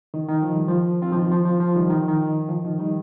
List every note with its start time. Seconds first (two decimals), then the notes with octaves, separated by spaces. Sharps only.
0.14 D#3
0.29 D#3
0.42 F3
0.56 G3
0.68 F3
1.02 C4 F4
1.12 F3
1.16 D#3
1.32 F3
1.46 F3
1.60 F3
1.76 D#3 G3
1.90 D#3
1.99 F3
2.08 D#3
2.49 F3
2.65 D#3
2.79 D#3 G3